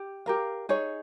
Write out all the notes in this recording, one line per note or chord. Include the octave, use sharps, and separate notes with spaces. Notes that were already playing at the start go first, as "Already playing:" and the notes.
Already playing: G4
G4 A#4 F5
D#4 G#4 C#5